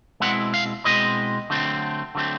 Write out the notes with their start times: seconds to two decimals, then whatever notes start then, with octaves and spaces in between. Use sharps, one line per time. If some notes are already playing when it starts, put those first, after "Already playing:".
0.20 B2 G#3 C4 E4 F#5
0.54 F5
0.85 B2 G#3 C4 E4 D#5
1.50 D3 F#3 A3 C4
2.15 D3 F#3 A3 C4